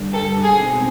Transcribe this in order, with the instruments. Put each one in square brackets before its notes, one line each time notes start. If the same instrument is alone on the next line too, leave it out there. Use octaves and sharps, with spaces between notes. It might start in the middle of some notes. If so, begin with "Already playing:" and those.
Already playing: [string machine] G2 D3 G3
[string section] A4
[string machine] B2 G#3 C4 D#4 [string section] G#4